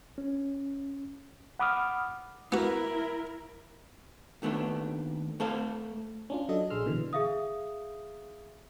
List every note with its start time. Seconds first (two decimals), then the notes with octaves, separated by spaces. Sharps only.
0.18 C#4
1.59 F#5 B5 D6 D#6 F6
2.52 B3 E4 F#4 A#4
4.42 D#2 D#3 A3 B3 D4
5.40 A3 A4 C5 F5
6.30 C#4 D4 F4
6.49 F#3 D4 A4 D#5
6.70 A#1 G#4 C6 E6 F6
6.86 B2 D3 E3
7.13 G#4 E5 F5 D#6